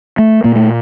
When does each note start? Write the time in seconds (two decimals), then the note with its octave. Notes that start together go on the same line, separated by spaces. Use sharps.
0.18 A3
0.44 A#2 A#3
0.56 A3